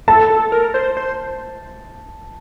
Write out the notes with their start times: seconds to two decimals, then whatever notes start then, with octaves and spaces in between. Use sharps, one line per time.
0.08 A4 A5
0.30 A4
0.52 A#4
0.74 C5
0.97 C5